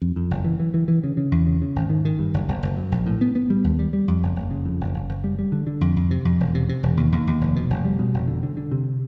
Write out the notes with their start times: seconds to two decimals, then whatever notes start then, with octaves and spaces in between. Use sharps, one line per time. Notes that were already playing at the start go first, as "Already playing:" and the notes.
0.02 F2
0.16 F2
0.31 F#1
0.44 E3
0.60 E3
0.74 E3
0.88 E3
1.04 C#3
1.17 C#3
1.32 E2
1.47 C#3
1.62 C#3
1.76 G#1
1.90 D#3
2.05 D#3
2.19 G2
2.34 F#1
2.48 F#1
2.63 F#1
2.76 F#2
2.92 A#1
3.06 A2
3.21 B3
3.35 B3
3.50 G3
3.64 D#2
3.79 G3
3.93 G3
4.08 F2
4.23 F#1
4.36 F#1
4.51 C#3
4.65 F2
4.81 F#1
4.94 F#1
5.09 F#1
5.24 G3
5.39 G3
5.52 D3
5.67 D3
5.81 F2
5.97 F2
6.11 C3
6.25 F2
6.40 E1
6.54 C3
6.69 C3
6.83 E1
6.97 D#2
7.12 D#2
7.27 D#2
7.41 F1
7.56 B2
7.70 F1
7.85 G3
7.99 B2
8.14 F1
8.28 D3
8.43 D3
8.57 D3
8.72 C3